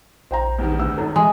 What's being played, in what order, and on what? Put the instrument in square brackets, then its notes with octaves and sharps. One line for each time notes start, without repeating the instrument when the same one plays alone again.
[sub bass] A#1 [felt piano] C5 G5 A#5
[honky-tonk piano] E2 G2 D#3
[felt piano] D2 E6
[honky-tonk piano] G#1 D#3 F#3 [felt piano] A4
[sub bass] E3 [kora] G#3 [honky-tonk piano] D#5 E5